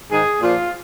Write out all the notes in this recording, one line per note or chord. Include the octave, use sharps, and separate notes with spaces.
G#2 D#3 G#4
A#2 F3 F4